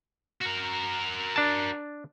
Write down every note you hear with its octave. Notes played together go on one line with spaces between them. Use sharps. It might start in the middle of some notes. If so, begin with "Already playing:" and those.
F#4 A#4
D4 A5